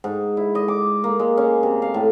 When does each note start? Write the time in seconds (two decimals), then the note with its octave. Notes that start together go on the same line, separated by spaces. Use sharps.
0.04 G#2
0.37 E4
0.55 D#5
0.68 D6
1.04 A#3
1.19 G#3
1.37 C#4
1.63 C3
1.82 F5
1.94 A2